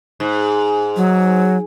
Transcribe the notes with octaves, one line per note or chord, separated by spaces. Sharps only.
G#2
F#3